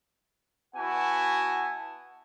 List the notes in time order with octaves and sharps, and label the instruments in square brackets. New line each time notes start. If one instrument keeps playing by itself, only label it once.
[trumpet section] B3 E4 F#4 F#5 G#5 A5